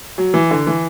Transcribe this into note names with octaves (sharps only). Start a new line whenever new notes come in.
F#3
E3
D3
E3